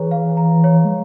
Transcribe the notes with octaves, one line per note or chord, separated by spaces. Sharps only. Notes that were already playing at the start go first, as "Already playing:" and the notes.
Already playing: E3 G#4 C#5 A#5
F5
A#5
C#5
G#3